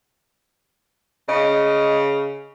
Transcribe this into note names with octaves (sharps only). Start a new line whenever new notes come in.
C#3 D#5